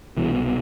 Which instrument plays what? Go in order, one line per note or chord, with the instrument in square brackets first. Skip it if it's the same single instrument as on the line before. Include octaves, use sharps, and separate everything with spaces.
[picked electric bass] C2 B2 E3